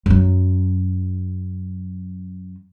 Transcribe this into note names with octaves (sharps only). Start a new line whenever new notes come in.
F#2 F#3